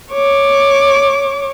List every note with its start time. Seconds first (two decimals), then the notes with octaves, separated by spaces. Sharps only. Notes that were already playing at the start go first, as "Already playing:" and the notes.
0.13 C#5 D6